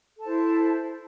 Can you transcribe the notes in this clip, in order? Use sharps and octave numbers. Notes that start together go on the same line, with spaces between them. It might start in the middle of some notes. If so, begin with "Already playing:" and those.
E4 A4 C5 A5